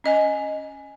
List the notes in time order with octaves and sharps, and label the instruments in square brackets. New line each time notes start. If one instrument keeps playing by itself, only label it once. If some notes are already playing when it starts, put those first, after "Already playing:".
[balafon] C#4 D#5 G#5